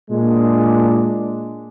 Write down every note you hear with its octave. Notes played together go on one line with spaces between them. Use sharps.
A#2 G#3 D4